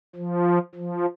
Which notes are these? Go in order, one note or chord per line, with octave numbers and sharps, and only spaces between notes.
F3
F3